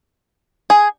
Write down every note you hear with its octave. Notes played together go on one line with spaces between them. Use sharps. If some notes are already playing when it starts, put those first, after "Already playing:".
G#4